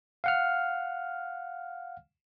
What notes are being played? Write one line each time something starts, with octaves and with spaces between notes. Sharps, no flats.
F5 F#5 F6